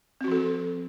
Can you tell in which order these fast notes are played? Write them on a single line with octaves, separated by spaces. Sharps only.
C4 F#4 F3 A4